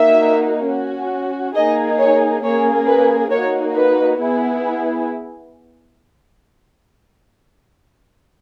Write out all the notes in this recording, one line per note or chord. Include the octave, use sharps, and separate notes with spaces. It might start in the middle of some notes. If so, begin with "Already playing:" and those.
Already playing: A#3 D#4 F#4 E5
C#4 F#4
A#3 D#4 G#4 D#5
C#5
A#3 C#4 G#4 C#5
B4
A#3 D#4 F#4 C#5
B4
B3 E4 G#4